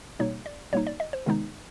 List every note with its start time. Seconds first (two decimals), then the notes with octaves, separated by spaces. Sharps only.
0.19 B2 G3 A#3 D#4 C#5
0.46 D5
0.73 B2 G3 A#3 D#4 C#5
0.87 D5
1.00 D#5
1.13 C5
1.26 C3 D#3 G#3 B3 D#4